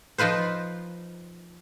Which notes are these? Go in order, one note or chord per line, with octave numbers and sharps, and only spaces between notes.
F3 D#4 F4 B4 C5